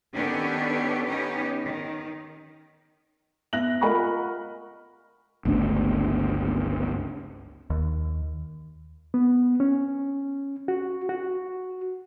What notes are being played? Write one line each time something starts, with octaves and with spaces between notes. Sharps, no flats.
D#3 B3 C#4 D4 G4 A4
B3 C#4 D#4 G4
D#3
B3 E5 F#6 A#6 F#7
F4 A#4 D#5 F#5 B5 C#6
G1 C#2 A3 D4
D#2
B3
C#4
F#4
F#4